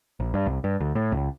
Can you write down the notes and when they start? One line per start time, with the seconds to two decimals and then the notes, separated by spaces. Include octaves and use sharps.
0.20 A#1
0.34 G2
0.46 C2
0.64 G2
0.80 D2
0.95 A2
1.12 C#2